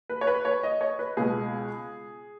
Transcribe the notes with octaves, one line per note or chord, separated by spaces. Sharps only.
B4
C#5
B4
C#5
D#5
C#5
B4
C#2 B2 G#3 G#4